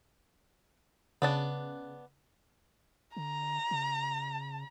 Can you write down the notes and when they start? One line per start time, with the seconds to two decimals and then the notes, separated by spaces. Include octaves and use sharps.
1.22 C#3 B3 D4 A5
3.16 D3 A#5
3.71 C#3